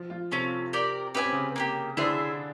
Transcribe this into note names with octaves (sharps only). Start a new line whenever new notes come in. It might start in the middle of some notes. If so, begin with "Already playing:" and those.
Already playing: F3 F4
F3 F4
C3 A3 C4 C#4 F4
G4 A#4 D5
C#4 G4 B4 E5 G#5
C4
C#3 C#4
A#3 D4 G4
D3 D4 E4 G#4 C5 E5